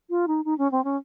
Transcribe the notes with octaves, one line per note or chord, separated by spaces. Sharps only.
F4
D#4
D#4
C#4
C4
C#4